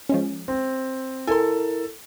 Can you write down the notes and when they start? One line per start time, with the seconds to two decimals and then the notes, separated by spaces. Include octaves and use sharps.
0.09 F3 G#3 C#4
0.48 C4
1.27 E4 A4 A#4 G#5 C6